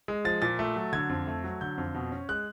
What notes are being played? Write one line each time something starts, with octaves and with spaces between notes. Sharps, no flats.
G#3
F3 A6
A#2 A6
A3
F#3
D3 G#6
F2
A3
F#3
D3 G6
F2
B2
C#4
G#3 F#6